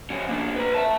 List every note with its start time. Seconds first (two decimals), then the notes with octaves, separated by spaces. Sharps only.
0.10 F3 C#4
0.29 A#3 D4
0.56 B4 A#5
0.74 E5 A5